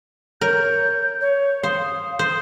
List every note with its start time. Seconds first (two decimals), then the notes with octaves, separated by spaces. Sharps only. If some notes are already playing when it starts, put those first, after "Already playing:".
0.41 A#4 C#5 G6
1.21 C#5
1.63 C5 F5 D#6
2.19 C5